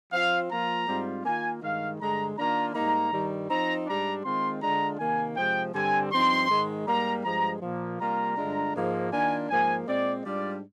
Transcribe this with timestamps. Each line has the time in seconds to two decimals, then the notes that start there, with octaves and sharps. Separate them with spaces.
0.12 F3 C4 F4 F5
0.50 F3 A#3 F4 A#5
0.87 G#2 G3 C4 F4
1.24 D#3 A#3 F4 G#5
1.62 G2 D#3 G#3 F5
1.99 G2 D3 G#3 A#5
2.37 D#3 A#3 D4 F4 A#5
2.74 G#2 G3 A#3 D#4 A#5
3.12 G2 D#3 G3
3.49 F3 C4 D#4 A#5
3.87 G#2 G3 D4 A#5
4.24 D#3 G#3 C4 F4 C6
4.62 D3 G#3 D4 F4 A#5
4.99 C3 D#3 A#3 G#5
5.37 C3 F3 G#3 G5
5.74 G2 D3 G3 C4 G#5
6.11 G2 F3 C4 D#4 C6
6.49 G#2 D#3 G#3
6.87 G#2 G3 A#3 A#5
7.24 G2 F3 G#3 A#5
7.62 A#2 F3 A#3
7.99 C3 G3 A#3 F4 A#5
8.37 G2 D3 G#3 D4 F4
8.74 G#2 F3 A#3
9.12 D#3 A#3 D4 F4 G#5
9.49 G#2 F3 A#3 G#5
9.86 A#2 G#3 C4 D5
10.24 G#2 G3 D4 F4 D5